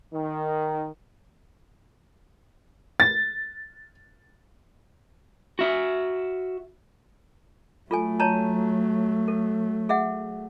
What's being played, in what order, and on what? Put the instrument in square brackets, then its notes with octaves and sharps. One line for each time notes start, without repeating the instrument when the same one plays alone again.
[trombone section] D#3
[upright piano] A6
[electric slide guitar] F#4 E5
[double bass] F#3 A3 [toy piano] F4 A4 G#5
[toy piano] C#5 A5 A#5
A4
G#4 E5 F#5